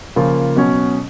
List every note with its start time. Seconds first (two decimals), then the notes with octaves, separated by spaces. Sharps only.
0.16 C#3 F3 A#3 F4
0.56 B2 F#3 C#4